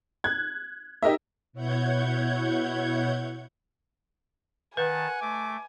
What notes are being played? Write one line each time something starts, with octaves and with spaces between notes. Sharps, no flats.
F#6 G#6
D#4 G4 A#4 D#5 E5
B2 E4 C#5 F#5 G6 G#6
D#3 B4 F#5 G#5 A5
A3 D6